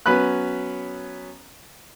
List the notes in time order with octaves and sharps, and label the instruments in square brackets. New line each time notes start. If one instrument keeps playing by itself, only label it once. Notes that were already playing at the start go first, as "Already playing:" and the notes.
[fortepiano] F#3 B3 C#4 B4 B5 F#6